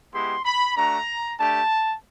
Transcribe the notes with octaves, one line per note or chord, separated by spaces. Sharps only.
G#3 B3 E4 G4 C6
B5
A3 D4 F#4 A#5
A3 D4 G4 A5